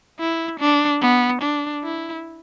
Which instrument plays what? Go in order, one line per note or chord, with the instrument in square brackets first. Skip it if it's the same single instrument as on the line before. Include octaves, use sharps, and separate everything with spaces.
[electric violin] E4
D4
B3
D4
E4